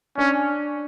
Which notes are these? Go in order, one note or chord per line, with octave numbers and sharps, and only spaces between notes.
C#4 D4